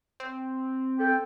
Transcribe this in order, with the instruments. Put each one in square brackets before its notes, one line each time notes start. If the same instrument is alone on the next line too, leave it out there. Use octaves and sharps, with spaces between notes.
[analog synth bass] C4
[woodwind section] A4 G5